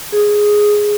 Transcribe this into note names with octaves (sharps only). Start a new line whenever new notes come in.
G#4